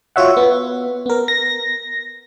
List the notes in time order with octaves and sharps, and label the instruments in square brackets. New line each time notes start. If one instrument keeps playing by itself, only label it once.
[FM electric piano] F4 F#4 C#5 E5 F#5
B3
B3 A#4
A#6